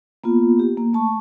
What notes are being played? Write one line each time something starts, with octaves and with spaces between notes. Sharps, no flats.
A#3 B3 F4
G4
A#3
A3 A5 C#6